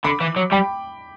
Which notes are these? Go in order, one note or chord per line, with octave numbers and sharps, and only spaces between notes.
D3 B5 D6
E3
F#3
G3 G5 B5